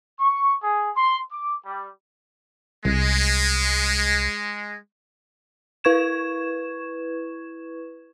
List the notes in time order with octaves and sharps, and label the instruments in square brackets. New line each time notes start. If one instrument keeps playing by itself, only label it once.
[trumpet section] C#6
G#4
C6
D6
G3
[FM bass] C2 [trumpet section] G#3
[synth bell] E4 B4 C#6 G#6 E7